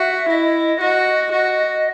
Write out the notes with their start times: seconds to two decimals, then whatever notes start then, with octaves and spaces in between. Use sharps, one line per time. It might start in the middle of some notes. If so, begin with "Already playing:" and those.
Already playing: F#4 E5
0.30 E4 D#5
0.81 F#4 D#5
1.33 F#4